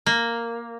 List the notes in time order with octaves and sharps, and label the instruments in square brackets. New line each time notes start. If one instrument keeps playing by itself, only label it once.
[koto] A#3